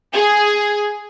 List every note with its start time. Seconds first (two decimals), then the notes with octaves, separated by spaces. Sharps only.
0.13 G#4